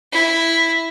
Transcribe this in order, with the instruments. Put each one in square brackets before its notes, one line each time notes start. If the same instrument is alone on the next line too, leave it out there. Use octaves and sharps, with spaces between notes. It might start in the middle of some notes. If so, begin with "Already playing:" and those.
[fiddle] E4